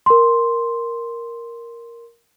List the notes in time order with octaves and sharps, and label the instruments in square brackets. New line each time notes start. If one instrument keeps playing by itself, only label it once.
[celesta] A#4 C6